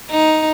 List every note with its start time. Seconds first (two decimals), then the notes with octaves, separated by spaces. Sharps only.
0.11 D#4